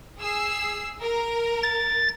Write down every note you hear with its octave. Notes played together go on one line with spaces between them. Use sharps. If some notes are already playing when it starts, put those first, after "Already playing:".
G#4 E6 C7
A#4
A6